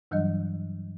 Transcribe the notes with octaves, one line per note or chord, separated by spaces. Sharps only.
G2 E3 F#3 G3 D4 D#5